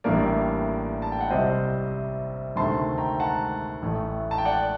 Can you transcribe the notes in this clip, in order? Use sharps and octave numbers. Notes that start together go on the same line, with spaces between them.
A1 A2 G3 A#3 D4 A#4 D5
A5
G5
F#5
C2 C3 G3 C4 C5 D#5
D2 C3 D#3 A3 A5 C6
G5 A#5
A#5
F#5 A5
A1 A2 A3
A5
G5
D5 F#5